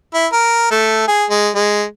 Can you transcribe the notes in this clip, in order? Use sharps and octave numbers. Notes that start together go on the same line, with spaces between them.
E4
A#4
A3
G#4
G#3
G#3